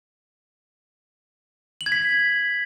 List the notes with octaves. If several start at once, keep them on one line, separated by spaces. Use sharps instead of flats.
F#7
G#6
B6